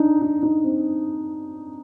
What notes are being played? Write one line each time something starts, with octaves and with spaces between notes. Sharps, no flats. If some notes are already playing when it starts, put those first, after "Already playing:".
Already playing: D4 D#4
D#4
D#4
C4